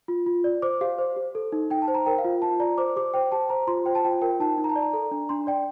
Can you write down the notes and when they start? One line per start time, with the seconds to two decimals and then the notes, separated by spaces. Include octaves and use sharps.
0.08 F4
0.26 F4
0.44 D5
0.62 C5 D6
0.81 G4 F5
0.98 C5
1.16 G4
1.35 A4
1.52 D#4
1.70 D#4 G5
1.82 A5
1.88 C5
1.94 A#5
2.06 A#4 G5
2.18 F5
2.24 F4
2.42 F4 A5
2.60 D5 A#5
2.78 C5 D6
2.96 G4 D6
3.14 C5 G5
3.32 G4 A5
3.50 C5 A#5
3.67 F4 C6
3.86 C5 G5
3.95 A5
4.04 F4 G5
4.22 A#4 G5
4.40 D#4 A5
4.58 D#4
4.64 A#5
4.69 A5
4.76 D5
4.82 A#5
4.93 A4
5.11 D4
5.29 D4 C6
5.47 D5 G5